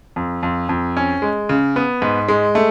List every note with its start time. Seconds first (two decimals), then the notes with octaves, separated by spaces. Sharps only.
0.16 F2
0.43 F2
0.69 F2
0.97 C#4
1.22 G#3
1.49 C#3
1.76 B3
2.02 G#2
2.28 G#3
2.55 A3